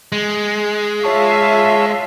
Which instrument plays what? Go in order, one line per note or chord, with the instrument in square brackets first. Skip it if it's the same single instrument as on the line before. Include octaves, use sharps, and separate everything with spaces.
[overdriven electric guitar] G#3
[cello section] F4 E5 F5 [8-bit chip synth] C#5 A5 C#6